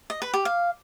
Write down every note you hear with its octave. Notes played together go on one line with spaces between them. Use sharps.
D#5
B4
G4
F5